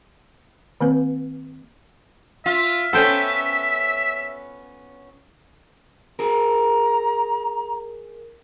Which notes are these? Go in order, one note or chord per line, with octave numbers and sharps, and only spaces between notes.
D#3 A#3 C4 B4
F4 E5
B3 C#4 A4 C5 G5
G#4 A#4 A#5